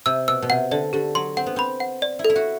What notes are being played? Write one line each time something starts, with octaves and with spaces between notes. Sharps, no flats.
C3 E6
B2 E6
B2
C3 F#5
D3 D5
D3 G4
F#3 C6
C4 F#5
B3
C4 B5
F#5
D5
E4
A4
E4
F#4